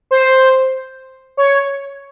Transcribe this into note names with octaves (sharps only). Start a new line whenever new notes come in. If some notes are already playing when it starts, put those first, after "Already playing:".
C5
C#5